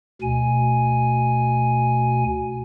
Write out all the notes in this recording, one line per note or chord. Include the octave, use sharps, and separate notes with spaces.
D2 B2 G#5